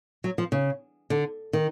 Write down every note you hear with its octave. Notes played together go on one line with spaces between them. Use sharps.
F#3
F3
C#3
D3
D#3